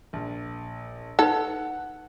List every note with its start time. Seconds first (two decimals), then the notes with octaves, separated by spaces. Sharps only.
0.13 A#1
1.19 D#4 A4 B4 F#5